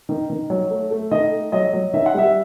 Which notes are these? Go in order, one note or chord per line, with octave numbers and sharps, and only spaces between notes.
D#3
D#3
F#3
A3
A3
D#3 D#5
A3
F#3 D#5
F#3
D#3 E5
F#5
G3 E5